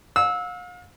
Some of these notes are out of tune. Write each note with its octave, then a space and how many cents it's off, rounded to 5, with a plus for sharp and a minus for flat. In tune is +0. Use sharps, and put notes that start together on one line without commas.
F5 +40 E6 -20